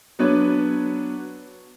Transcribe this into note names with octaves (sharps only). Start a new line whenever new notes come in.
F#3 B3 D4 B4 C#5